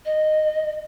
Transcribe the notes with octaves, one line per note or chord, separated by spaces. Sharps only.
D#5